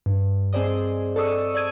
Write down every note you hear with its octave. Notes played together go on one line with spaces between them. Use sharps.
G2
C4 G#4 C5 D5 D#5
A4 D5 C#6 D#6 E6
D5 E6 G#6 D#7